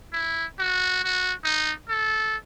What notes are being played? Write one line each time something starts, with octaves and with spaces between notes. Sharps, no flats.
E4
F#4
F#4
D#4
A4